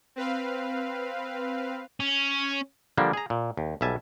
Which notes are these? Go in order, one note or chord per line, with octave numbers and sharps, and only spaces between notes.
C4 B4 F5
C#4
D3 F3 G3 A#3 D4
G#4 A#5
A#2
D#2
B1 G3 E5 G#5 A5